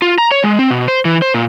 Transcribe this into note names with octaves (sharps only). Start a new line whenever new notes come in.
F4
A#5
C#5
G#3
C4
B2
C5
E3
C5
A#2